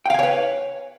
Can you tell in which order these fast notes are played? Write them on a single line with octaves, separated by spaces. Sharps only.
G5 F5 G#5 C#5 B4